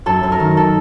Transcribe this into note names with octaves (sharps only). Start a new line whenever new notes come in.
F#2 A4
F#2
A#4
D#3
A4